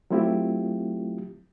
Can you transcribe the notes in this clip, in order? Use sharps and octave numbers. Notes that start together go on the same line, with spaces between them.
F#3 A3 C4 E4 F4 G4